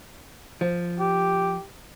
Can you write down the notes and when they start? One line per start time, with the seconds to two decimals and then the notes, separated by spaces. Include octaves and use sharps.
0.61 F3
1.00 G4